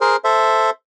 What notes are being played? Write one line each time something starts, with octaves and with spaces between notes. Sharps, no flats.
G#4 A#4 C5
A4 C5 E5